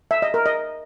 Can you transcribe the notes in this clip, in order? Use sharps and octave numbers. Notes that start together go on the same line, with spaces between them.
E5
D#5
A#4
D#5